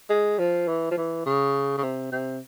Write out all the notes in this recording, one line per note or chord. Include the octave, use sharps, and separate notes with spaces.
G#3
F3
E3
F3
E3
C#3
C#3
C3
C3